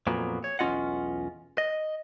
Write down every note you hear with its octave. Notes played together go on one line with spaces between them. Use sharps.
F2 A#2 F#3 B3
C#5
B1 E2 C#4 F4 D#5 F#5
D#5